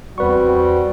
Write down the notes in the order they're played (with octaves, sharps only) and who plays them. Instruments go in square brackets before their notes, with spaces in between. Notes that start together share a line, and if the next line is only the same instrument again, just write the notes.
[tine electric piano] E2 B4 C#6 [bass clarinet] G3 [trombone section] C4 F#4